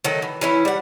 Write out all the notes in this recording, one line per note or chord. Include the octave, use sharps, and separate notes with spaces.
D#3 F#3 A3
E3
E3 C#4 E4
G3 F#5